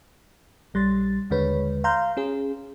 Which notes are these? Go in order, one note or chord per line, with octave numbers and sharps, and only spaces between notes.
A#1 G3 C6 A6
D#2 D3 G#3 B4 C#5
F5 A#5 C6 F6 G6
C#4 G#4